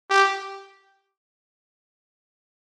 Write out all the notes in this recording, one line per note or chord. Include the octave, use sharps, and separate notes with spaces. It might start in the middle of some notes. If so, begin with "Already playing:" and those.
G4